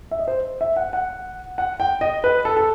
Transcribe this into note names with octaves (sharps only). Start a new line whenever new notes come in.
E5
D#5
C5
E5
F#5
F#5
F#5
G5
D#5
B4
A4
A4